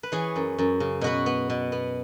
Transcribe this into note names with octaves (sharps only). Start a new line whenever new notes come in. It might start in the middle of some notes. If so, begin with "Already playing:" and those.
B4
E3 G#4 C#5
F#2
F#2
C#3
B2 F#4 B4
B3
B2
B3